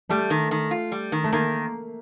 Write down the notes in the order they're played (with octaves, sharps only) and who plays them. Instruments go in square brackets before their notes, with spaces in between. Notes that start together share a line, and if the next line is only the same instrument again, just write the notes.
[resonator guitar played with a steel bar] G3 [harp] A3
[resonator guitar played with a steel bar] D#3
D#3
F4
G3
D#3
[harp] A3
[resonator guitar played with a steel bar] D#3 [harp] A#3